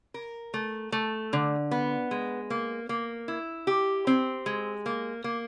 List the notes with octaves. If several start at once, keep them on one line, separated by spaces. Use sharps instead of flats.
A#4
A3
A3
D3
B3
G#3
A#3
A#3
E4
G4
C4
G#3
A#3
A#3